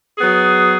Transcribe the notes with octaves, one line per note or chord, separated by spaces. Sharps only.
F#3 B3 G#4